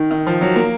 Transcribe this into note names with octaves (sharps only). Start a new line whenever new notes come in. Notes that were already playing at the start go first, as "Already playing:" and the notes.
Already playing: D#3
D#3
F3
F#3
A#3